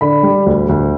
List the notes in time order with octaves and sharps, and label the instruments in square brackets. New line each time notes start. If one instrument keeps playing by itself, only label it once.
[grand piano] D3 B5
G3
D2
D2